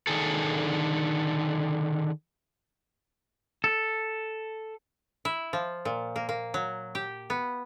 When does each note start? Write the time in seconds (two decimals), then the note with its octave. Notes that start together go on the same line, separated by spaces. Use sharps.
0.07 D3 D#3 G#4 A4
3.64 A4
5.25 E4
5.53 F3
5.85 A#2
6.16 A#3
6.29 A#3
6.54 F#3
6.95 G4
7.30 B3